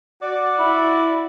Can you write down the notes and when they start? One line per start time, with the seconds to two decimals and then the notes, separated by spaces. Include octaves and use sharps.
0.22 F#4 D5
0.59 E4